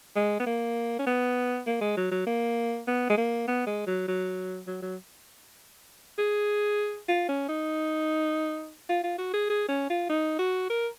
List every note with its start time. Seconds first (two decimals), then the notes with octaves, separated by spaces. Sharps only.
0.16 G#3
0.40 B3
0.46 A#3
0.99 C#4
1.06 B3
1.67 A#3
1.81 G#3
1.97 F#3
2.11 F#3
2.27 A#3
2.87 B3
3.10 G#3
3.17 A#3
3.48 B3
3.67 G#3
3.87 F#3
4.08 F#3
4.67 F#3
4.82 F#3
6.18 G#4
7.08 F4
7.29 C#4
7.48 D#4
8.89 F4
9.03 F4
9.18 F#4
9.34 G#4
9.50 G#4
9.68 C#4
9.90 F4
10.09 D#4
10.39 F#4
10.69 A#4